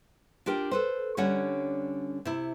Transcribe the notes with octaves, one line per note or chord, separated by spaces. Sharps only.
D4 F4 G4 A#4
A4 B4 C5
D3 G3 C#4 D4 C#5 F#5
C3 E4